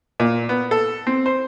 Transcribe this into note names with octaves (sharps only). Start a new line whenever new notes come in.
A#2
B3
A4
C4
C5